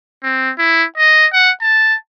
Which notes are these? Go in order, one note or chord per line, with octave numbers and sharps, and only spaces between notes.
C4
E4
D#5
F#5
A5